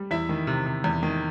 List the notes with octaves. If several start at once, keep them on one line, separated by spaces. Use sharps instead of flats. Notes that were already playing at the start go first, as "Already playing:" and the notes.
Already playing: G3
E2 E4 E5
D#3
C3
C3
E2
D#3